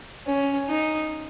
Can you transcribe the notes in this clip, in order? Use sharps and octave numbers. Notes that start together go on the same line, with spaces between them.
C#4
D#4